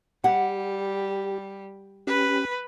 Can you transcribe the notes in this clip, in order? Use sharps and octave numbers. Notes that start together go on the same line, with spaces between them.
G3 G4 F#5
C#4 G4 B4